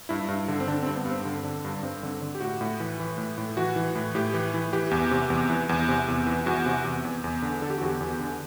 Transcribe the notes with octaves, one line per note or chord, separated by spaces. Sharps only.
G2 E4
G2
D3
C4
D3 D4
C4
G2
B3
G2 C4
D3
D3
G2
G2 C4
D3
D3
G4
A2 F#4
A2
E3
E3
A2
A2
E3 F#4
E3
A2
A2 G4
E3
E3
E3 G4
E2
C3
E2
E3
E2
C3
E2
E3
E2 F#4
C3
E2
E2
E2
D3
D3 A4
G4
F#4
E2 G4
E2
D3